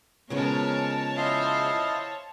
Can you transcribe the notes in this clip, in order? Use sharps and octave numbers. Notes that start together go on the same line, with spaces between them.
C#3 F3 G#3 B3 A#4 C#5 A5
E4 C5 D#5 F5